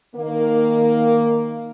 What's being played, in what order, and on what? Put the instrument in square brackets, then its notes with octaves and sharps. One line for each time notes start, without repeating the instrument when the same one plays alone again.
[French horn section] D#3 A#3